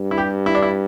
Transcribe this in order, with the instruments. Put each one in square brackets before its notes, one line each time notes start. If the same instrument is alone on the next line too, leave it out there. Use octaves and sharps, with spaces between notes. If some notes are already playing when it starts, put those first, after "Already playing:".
Already playing: [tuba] G2
[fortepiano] E4
G4
E4
D4
E4